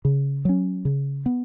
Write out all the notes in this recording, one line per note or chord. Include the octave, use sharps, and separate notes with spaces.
C#3
F#3 C#4
C#3
B3